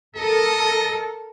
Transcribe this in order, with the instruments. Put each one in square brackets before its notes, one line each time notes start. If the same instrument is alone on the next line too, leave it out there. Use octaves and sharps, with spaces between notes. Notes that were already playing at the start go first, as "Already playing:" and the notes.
[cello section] A4 A#4 [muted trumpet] D#5